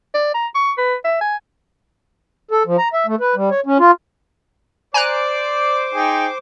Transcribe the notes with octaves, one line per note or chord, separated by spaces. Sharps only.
D5
A#5
C#6
B4
E5
G#5
A4
F3
A#5
E5
A3
B4
G3
C#5
C#4
F4
C5 D5 G#5 A#5 D6 F#6
D#4 G#4 G5